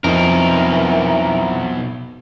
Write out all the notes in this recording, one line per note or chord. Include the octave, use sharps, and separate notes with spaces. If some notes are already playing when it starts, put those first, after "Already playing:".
F2 B2 E3 D#4 A#4